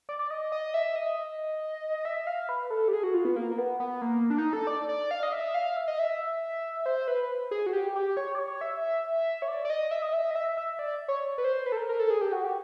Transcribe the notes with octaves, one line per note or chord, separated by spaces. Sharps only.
D5
D5
D#5
D#5
E5
D#5
E5
F5
B4
A4
G4
G#4
F#4
F4
B3
A#3
A#3
B3
B3
A#3
D4
D#4
A4
D5
D5
F5
D#5
E5
F5
E5
D#5
E5
C5
B4
G#4
F#4
G4
G4
C#5
D5
C#5
E5
C#5
D5
D5
D#5
E5
D#5
E5
D#5
E5
E5
D5
C#5
B4
C5
B4
A4
A#4
A#4
A4
G#4
G4
F#4
G4